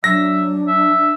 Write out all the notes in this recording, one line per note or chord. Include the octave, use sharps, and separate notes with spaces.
F#3 D4 E5 A#6
E5